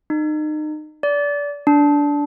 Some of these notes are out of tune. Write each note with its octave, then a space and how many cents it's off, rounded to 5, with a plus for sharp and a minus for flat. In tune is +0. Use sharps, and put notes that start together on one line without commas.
D#4 -30
D5 -25
D4 -15